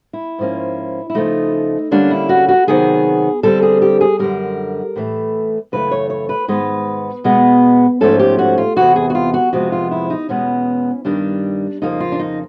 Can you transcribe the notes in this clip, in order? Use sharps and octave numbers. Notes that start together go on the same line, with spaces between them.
E4
G#2 F3 A#3 C#4
E4
C#3 F3 A3 D#4
D3 G3 A#3 C#4 D4
E4
F#4
F#4
C3 D#3 F#3 B3 G#4
D3 G3 C4 A4
G#4
G4
G#4
F#2 D3 G3 A#4
A2 E3 A3
F#2 C#3 E3 A3 B4
C#5
C#5
B4
G#2 D#3 G#3 B3 B4
B2 G#3 B3
G#2 F3 A3 C#4 A4
G4
F#4
F4
E2 C3 E3 F#4
G#4
F#4
F4
F#4
F2 C3 F3 G#3 B3 F#4
F4
E4
D#4
E2 B2 G#3 B3 C#4
G2 D#3 G3 D4
F2 C#3 F3 A#3 D#4
F4
D4
D#4